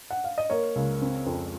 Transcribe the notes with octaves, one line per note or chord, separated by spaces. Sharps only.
F#5
F5
D#5
A#3 A#4 C#5
C#2
C4
F2